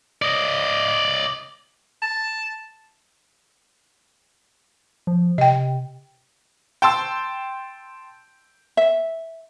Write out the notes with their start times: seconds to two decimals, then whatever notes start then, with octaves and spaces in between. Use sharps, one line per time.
0.22 D5 D#5
2.02 A5
5.07 F3
5.38 C3 D#5 G5
6.82 G5 A5 C6 E6
8.77 E5